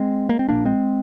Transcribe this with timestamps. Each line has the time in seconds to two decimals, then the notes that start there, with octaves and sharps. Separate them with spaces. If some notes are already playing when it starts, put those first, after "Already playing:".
Already playing: G#3 C4
0.29 A#3
0.39 C4
0.49 A#1 A#2 A#3 D4
0.65 G#3 C4